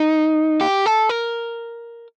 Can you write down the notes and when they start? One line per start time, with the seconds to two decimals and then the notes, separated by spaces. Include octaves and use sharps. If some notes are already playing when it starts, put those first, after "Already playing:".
Already playing: D#4
0.61 G4
0.86 A4
1.09 A#4